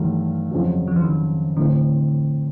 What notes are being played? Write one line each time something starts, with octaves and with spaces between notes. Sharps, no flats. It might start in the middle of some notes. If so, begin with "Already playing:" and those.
Already playing: G2 D#3 E3 F#3 A3
F2 C#3 F#3
F3
E3
D#3
A2 D3 E3 A3 C4